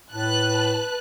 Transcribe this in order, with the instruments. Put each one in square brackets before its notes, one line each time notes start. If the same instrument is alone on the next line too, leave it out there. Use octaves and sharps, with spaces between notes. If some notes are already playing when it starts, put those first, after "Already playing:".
[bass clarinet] A2 [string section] B4 A5 F#6